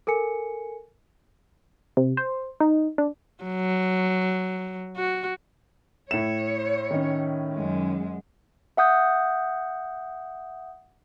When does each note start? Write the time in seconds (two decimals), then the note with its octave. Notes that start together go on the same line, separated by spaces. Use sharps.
0.07 A4 A#4 G#5 C#7
1.97 C3
2.17 C5
2.60 D#4
2.98 D4
3.44 F#3
4.96 F#4
6.11 A2 C#5 E5 E7
6.91 D#3 C#4
7.53 F#2 G#3
8.77 E5 F#5 D#6 G6